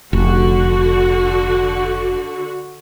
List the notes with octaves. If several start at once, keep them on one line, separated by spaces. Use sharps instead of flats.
F1 D3 F#4